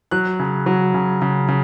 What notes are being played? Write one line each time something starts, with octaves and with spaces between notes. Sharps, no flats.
F#3 F#6
C#3
F#3
C#3
C#3
C#3